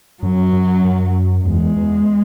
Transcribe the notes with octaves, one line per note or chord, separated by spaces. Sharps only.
F#2 F#3
F#2
F#2
E2 G#3
E2